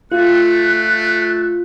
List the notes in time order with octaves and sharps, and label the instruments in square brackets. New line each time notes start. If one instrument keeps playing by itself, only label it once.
[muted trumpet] A3 [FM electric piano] F4 [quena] F#6